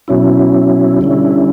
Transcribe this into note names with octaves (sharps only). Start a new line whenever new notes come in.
B2 F#3 C#4 E4
D3 G3 C#4 E4